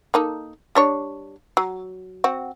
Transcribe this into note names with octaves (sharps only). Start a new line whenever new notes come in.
A#3 D#4 A4
G3 D4 C#5
F#3
C4 F#4